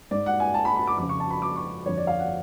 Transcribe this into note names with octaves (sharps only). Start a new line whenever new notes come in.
G#2 D5
F#5
G#5
A5
B5
B5
D6
F2 C#3 D6
C#6
A5
B5
D6
C#6
F2 D3 C#5
D5
F5
F#5